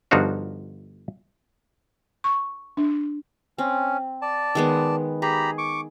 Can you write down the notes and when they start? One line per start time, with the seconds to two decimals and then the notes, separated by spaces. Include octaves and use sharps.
0.11 G1 F3 D4 D#4 F#4 F5
2.24 C#6
2.77 D4
3.58 C4 C#4
4.22 D5 A5
4.55 D#3 G#3 B3
5.22 G4 G#4 A#5 B5
5.58 C#6 D6